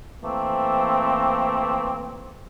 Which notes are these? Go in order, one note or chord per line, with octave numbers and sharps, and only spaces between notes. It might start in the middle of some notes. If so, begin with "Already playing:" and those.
E3 A3 A#3 C4